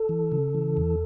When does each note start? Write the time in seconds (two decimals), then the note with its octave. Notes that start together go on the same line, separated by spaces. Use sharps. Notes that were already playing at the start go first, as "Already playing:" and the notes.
Already playing: A4
0.09 E3
0.32 C#3
0.54 E3
0.77 E2